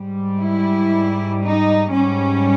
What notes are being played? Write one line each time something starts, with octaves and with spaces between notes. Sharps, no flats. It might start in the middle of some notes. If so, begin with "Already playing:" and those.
Already playing: G#2 G3
E4
D#4
G#2 G3 C#4